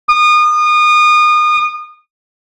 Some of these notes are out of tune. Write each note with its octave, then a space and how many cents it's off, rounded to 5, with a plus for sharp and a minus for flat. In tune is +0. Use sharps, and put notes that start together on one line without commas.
D#6 -30